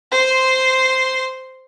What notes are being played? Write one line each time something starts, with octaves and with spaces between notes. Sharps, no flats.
C5 C6